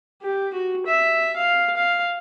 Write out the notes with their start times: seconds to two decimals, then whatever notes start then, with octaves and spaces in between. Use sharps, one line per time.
0.22 G4
0.54 F#4
0.86 E5
1.36 F5
1.77 F5